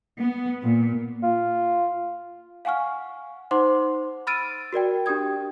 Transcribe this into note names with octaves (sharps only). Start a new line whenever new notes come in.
B3
A#2
F4
F5 F#5 G#5 C#6 F6
D#4 C5 F#5 C6 D6
B5 E6 F6 A6 D7 D#7
F#4 A#4 D5 G5
D4 G4 G5 D#6 G#6